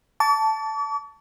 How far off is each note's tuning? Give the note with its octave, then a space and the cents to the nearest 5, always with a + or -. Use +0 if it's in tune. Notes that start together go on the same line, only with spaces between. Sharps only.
A5 +0 D6 -45